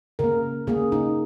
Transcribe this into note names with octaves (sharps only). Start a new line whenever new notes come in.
C#3 A#3 A#4
C#3 A#3 G#4
D#4